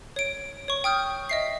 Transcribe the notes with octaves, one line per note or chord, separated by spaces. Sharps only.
C#5 D7
C#5 C#6
G5 D#6 F6 G6
D#5 E5 C7